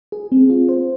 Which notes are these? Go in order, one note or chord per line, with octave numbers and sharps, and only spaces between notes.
G#4
C4
F4
C5